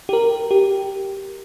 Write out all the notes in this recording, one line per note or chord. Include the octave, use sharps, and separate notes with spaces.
G4
A#4
G4